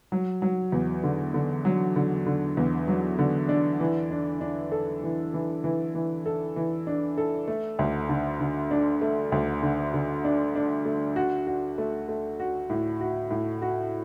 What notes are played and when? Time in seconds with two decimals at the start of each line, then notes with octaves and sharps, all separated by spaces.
0.12 F#3
0.42 F#3
0.72 E2
1.03 D3
1.34 D3
1.65 F#3
1.96 D3
2.26 D3
2.57 E2
2.88 F#3
3.19 D3
3.49 D4
3.80 E3
4.10 D4
4.41 D4
4.72 A4
5.03 E3
5.34 E3
5.64 E3
5.95 E3
6.26 A4
6.56 E3
6.87 D4
7.18 A4
7.48 A3
7.79 D2
8.09 D3
8.40 D3
8.71 D4
9.01 A3
9.32 D2
9.63 D3
9.94 D3
10.24 D4
10.55 D4
10.85 A3
11.16 F#4
11.47 F#4
11.78 A3
12.08 A3
12.40 F#4
12.70 A2
13.01 F#4
13.31 A2
13.62 F#4